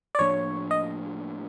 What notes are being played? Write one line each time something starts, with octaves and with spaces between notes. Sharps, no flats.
D5
A2 F3 A#3 D4 C#5
D#5